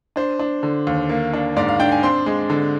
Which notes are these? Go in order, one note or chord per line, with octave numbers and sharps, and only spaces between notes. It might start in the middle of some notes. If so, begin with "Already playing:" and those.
D4 C5
D4
D3
D#2
A#3
D4
G#2 D5
F5
D4 G5
G#5
C4 C6
G#3
D3